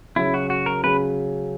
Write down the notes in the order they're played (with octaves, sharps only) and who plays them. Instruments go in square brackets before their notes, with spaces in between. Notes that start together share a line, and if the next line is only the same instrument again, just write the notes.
[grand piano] C#3 F#3 C#4 [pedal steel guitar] E4
[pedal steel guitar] F#4
F#4
A#4
[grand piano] C#3 F#3 C#4 [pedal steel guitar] B4